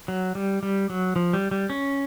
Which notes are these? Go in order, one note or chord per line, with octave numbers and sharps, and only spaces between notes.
F#3
G3
G3
F#3
F3
G3
G3
C#4